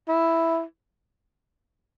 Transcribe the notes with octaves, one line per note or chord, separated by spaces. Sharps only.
E4